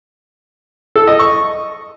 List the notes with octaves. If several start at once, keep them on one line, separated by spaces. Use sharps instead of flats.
A4
D#5
C#6